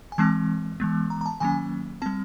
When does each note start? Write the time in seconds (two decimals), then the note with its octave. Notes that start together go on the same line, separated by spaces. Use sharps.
0.12 G#5
0.18 E3 G#3 C4 A5
0.80 E3 G#3 B3
1.10 A#5
1.21 A#5
1.26 A5
1.40 D#3 F#3 A#3 C#4 G#5
2.02 G3 C4 A5